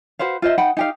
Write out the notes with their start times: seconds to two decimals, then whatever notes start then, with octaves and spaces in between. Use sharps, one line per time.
0.19 F#4 B4 C5 F5
0.42 F4 C5 D#5 E5
0.58 D#4 F#5 G5 B5
0.77 D#4 G4 F5